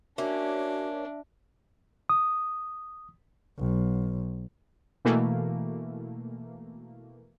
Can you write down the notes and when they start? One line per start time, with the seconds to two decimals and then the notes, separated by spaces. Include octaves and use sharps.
0.18 A#3 C#4 D4 F#4 E5
2.09 D#6
3.59 B1
5.05 B2 E3 A3 A#3